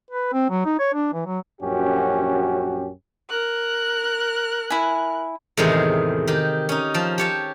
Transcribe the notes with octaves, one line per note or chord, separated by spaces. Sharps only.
B4
C4
F#3
D#4
C#5
D4
E3
F#3
A#1 F#2 C#4 F#4 G4
A#4 F#6
E4 G#5
E2 A2 C3 D#3 G#3 G#4
D#3 G4
C#4 D#4
F3 A5
G4 C#5 A5